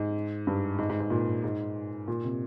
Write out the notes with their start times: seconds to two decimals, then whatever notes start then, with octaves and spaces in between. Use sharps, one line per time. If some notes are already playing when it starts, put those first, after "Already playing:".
Already playing: G#2
0.47 G2
0.78 G#2
0.90 G#2
1.00 G#2
1.10 A#2
1.44 G#2
2.08 A#2
2.24 C3